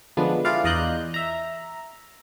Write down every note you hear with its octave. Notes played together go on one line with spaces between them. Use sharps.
D3 F3 G#3 B3 D4
E4 F4 G#4 B4 D5 F5
E2 D5 D#5 A#5 F#6 G6
E5 A#5